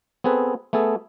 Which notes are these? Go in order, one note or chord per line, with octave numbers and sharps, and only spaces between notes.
B3 C4 G#4 A4 B4
A3 B3 G#4 A4